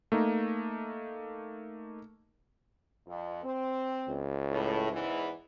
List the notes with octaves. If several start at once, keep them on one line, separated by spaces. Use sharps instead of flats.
A3 A#3 D#4
F2
C4
C#2
A2
E2 G#2 E3